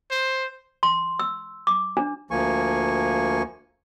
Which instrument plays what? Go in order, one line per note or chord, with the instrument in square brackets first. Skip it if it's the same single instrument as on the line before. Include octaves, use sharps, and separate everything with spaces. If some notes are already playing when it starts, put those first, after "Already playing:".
[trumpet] C5
[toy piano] C6
E6
D6
D4
[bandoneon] D2 F3 A#3 G#5 C#6